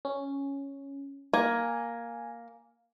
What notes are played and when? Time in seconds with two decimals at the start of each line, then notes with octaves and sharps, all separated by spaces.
0.05 C#4
1.33 A#3 G#5